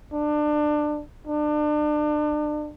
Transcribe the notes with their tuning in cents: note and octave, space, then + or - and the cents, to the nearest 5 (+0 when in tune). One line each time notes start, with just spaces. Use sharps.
D4 +25
D4 +35